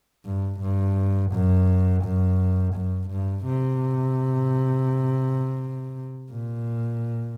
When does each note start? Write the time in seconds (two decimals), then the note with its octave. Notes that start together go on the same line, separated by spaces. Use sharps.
0.25 G2
0.61 G2
1.32 F#2
2.04 F#2
2.74 F#2
3.10 G2
3.46 C3
6.31 A#2